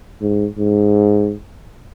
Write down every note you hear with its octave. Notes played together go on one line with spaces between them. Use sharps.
G#2
G#2